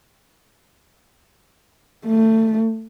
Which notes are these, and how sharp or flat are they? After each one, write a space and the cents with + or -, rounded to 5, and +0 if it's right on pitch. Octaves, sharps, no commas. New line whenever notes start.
A3 +20